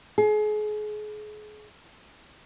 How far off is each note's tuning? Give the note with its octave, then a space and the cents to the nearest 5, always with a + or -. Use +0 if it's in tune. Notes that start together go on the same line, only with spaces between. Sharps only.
G#4 +35